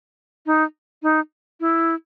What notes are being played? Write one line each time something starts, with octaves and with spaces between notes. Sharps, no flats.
D#4
D#4
E4